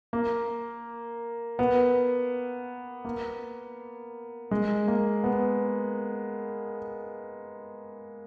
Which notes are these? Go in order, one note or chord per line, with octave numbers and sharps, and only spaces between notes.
A#3
B3
A#3
G#3
A#3
B3